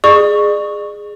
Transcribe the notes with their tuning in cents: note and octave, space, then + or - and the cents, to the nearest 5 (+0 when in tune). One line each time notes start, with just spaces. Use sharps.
G#4 +0 D5 +40 C#6 +0